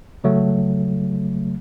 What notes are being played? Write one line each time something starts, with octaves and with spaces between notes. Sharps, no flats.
C#3 F#3 A3